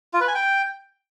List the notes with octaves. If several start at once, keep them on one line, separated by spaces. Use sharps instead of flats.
F4
B4
G#5
G5